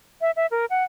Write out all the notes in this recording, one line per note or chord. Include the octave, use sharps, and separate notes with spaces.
E5
E5
A#4
F#5